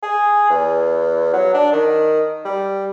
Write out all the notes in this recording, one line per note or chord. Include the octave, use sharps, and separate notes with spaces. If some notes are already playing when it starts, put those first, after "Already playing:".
G#4
E2
F#3
D4
D#3
G3